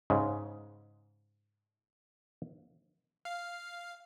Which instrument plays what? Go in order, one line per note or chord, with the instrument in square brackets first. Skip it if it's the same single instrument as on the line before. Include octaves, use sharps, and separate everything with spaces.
[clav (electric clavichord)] G#2 C#3
[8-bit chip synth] F5